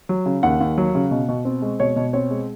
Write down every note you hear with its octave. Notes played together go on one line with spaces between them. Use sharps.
F#3
C#3
D#2 F#5
D#2
F#3
C#3
B2
B2
C4
G#3
B2 C#5
B2
C4 C#5
G#3